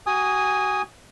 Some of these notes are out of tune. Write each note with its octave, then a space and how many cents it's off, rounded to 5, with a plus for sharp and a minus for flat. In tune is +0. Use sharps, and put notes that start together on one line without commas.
F#4 +25 G#5 -10 D#6 +0